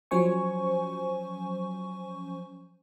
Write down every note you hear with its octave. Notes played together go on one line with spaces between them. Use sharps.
F3 F#3 C#4 C5 G#5 C#6